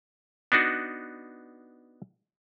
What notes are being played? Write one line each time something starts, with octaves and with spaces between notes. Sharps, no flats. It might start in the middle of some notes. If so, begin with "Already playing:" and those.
B3 D4 D#4 F#4